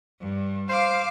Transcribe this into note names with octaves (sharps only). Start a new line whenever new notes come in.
G2
C5 F5 D6